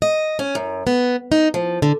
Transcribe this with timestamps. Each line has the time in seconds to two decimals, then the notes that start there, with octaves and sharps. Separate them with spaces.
0.02 D#5
0.39 C#4
0.55 F#2
0.87 B3
1.32 D#4
1.54 F3
1.82 D3